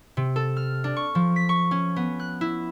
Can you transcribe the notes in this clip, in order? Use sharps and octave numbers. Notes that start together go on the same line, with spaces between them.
C3
A4
F6
D4
C#6
F3
B6
C#6
C#4
B3
F#6
E4